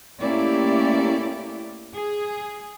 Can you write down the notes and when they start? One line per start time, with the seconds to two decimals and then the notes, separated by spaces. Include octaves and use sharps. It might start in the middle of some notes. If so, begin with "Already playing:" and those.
0.21 A3 A#3 C#4 E4 G4 D5
1.94 G#4